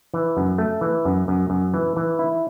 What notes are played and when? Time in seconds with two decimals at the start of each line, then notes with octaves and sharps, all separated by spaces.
0.14 E3
0.37 F#2
0.58 A3
0.81 E3
1.05 F#2
1.28 F#2
1.50 F#2
1.74 E3
1.96 E3
2.19 E4